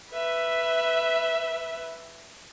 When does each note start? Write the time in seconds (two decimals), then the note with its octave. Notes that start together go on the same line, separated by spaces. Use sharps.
0.12 B4 E5